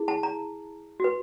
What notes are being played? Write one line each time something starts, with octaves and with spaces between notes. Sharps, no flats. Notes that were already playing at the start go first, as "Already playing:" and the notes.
Already playing: E4 G#4
A5
A#5
F#4 B4